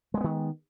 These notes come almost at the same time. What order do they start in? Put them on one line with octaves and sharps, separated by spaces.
G#3 A#3 B3 D#3